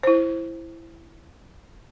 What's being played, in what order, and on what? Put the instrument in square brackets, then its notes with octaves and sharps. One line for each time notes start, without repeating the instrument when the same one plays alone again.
[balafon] E4 C5